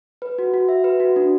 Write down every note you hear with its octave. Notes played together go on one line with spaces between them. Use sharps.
B4
F#4
F#4
E5
B4
F#4
D4